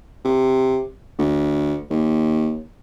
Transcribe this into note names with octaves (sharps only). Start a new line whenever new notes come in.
C3
D2
D#2